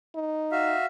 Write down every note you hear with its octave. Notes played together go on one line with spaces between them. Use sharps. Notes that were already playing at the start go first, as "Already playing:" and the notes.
D#4
F#4 E5 F5